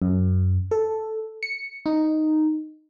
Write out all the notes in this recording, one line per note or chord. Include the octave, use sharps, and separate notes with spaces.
F#2
A4
C#7
D#4